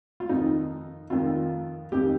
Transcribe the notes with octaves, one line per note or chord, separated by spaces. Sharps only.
F4
F2 D#3 D#4
F2 D#3 F4
F2 D#3 G4